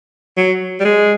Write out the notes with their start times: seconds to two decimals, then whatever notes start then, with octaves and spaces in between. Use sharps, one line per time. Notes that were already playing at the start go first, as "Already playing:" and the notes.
0.37 F#3
0.80 G3
0.85 G#3